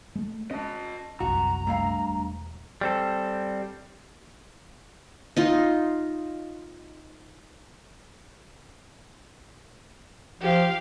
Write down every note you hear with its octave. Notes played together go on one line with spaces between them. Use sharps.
G#3 A3
C#4 D#5 A5
G1 C2 F#2 F#4 A#5
G2 A3 F5
E1
G3 C4 A4
D#4 F4
F3 G4 F5